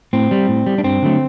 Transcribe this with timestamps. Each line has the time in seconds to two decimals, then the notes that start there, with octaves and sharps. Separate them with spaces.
0.13 A2 C4
0.31 G3
0.48 A2
0.66 G3
0.78 D4
0.83 G2 C4
1.02 D3 F#3 A3